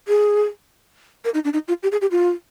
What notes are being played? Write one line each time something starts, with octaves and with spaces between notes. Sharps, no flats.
G#4
A#4
D#4
D4
D#4
F4
G4
G#4
G4
F4